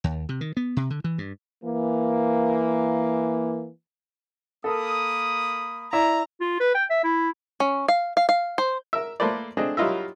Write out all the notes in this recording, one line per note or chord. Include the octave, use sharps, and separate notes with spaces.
D#2
C3
D#3
B3
C3
D3
E3
G2
E3 A#3
A#3 A4 A#4 B5 D#6
E4 D5 A#5
F4
B4
G5
E5
E4
C#4
F5
F5
F5
C5
A#4 E5
A3 A#3 A4 B4 C5 D5
A3 C4 D4 G#4 D#5
F#3 G3 E4 F4 D#5 E5